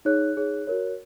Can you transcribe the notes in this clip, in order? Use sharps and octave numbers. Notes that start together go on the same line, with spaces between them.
D#4 G#4 C#5 F#6
D#4 G#4 C#5
F#4 A#4 C#5